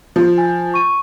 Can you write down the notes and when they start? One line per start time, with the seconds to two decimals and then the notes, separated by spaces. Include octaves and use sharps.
0.16 F3
0.38 G#5
0.74 C#6 D#7